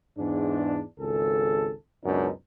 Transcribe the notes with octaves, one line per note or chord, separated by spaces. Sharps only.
E2 G#2 D4
G#1 C#2 G#4 A4
C#2 F#2 B2 D4 D#4